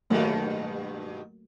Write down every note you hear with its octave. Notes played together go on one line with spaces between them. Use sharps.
G2 B2 D#3 F#3 A3 A#3